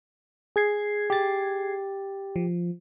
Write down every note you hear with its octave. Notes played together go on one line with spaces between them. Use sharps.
G#4 G#6 C7
G4 A6
F3